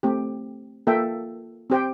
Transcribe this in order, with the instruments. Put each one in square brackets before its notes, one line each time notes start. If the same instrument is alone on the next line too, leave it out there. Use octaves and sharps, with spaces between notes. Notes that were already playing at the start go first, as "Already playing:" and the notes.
[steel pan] A3 C4 G4
A#3 F4 A4 E5 G5
C4 G4 C5 G5